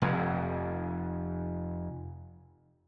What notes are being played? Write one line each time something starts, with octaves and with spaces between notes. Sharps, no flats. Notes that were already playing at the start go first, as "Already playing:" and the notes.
F1 F2